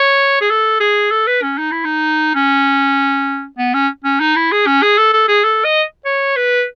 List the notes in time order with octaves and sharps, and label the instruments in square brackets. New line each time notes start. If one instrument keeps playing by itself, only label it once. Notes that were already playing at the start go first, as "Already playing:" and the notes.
Already playing: [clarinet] C#5
G#4
A4
G#4
A4
B4
C#4
D#4
E4
D#4
C#4
B3
C#4
C#4
D#4
E4
G#4
C#4
G#4
A4
A4
G#4
A4
D#5
C#5
B4